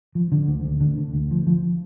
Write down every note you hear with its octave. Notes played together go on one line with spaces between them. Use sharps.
F3
D3
D2
D2
D3
D3
D2
F3
F3